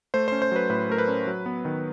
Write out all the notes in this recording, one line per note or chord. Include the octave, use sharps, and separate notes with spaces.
A3 C5
C#4 C5
C5
F#3 B4
A2 B4
A3 A#4
B4
C#4
F#3
B3
D#3